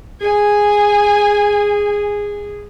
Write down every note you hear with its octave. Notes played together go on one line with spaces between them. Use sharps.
G#4 G#5